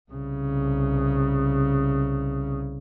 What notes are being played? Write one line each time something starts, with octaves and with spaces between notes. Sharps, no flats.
C2 C#3